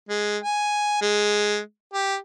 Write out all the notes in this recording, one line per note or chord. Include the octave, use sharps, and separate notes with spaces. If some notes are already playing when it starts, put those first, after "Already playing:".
G#3
G#5
G#3
G4